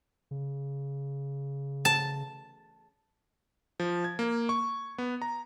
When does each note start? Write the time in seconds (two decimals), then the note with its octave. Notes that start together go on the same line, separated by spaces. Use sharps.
0.31 C#3
1.85 A5
3.80 F3
4.04 G#6
4.19 A#3
4.49 C#6
4.98 B3
5.22 A#5